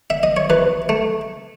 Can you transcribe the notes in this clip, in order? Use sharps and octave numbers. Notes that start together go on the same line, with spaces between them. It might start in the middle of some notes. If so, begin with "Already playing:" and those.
E5
D#5
C#5
E3 B4
A3